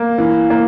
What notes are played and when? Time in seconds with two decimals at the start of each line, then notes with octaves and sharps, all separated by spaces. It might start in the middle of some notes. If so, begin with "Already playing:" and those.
Already playing: A#3
0.18 E3
0.50 A#3